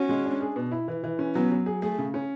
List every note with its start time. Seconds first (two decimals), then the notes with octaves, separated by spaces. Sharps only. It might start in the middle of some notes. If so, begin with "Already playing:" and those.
Already playing: C#4 F#4
0.09 G#3
0.25 D4
0.41 G#4
0.56 B2
0.72 E4
0.88 E3
1.04 E3
1.19 C#4
1.35 F#3 B3
1.52 F#3
1.66 G#4
1.82 A3 G#4
1.98 C#3
2.14 C#4